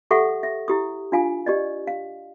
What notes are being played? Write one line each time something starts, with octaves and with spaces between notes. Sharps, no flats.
G4 A4 E5 F#5 C#6 D#6
E5
E4 G4 D#6
D4 F4 F5 G#5
G4 D5 D#5
F5